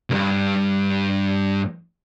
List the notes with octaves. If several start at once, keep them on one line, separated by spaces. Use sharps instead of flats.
C#2 G2